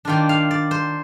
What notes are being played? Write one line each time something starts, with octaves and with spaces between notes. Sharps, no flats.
D#3 A#3 D4 F4 G5
F5
D5
C5